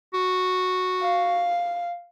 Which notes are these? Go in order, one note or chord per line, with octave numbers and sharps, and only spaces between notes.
F#4
F5